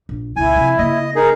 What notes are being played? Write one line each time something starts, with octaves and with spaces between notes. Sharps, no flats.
A#1
C#2 A#2 E4 G#5
F2 C3
C#3 A#3 D#5
D#4 G#4 A#4